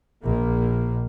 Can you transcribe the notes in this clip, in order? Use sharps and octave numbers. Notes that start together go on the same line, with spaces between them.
A#1 A#3